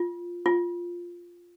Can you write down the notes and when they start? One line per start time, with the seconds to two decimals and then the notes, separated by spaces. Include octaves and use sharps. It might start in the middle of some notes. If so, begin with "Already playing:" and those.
Already playing: F4
0.46 F4